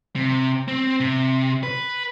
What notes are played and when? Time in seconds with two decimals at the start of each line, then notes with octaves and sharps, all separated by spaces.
0.16 C3
0.68 C4
1.00 C3
1.63 B4